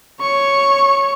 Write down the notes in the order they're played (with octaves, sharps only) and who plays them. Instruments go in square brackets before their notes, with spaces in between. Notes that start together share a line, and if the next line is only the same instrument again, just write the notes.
[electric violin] C#5 C#6